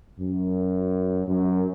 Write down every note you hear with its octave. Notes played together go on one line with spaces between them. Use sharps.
F#2
F#2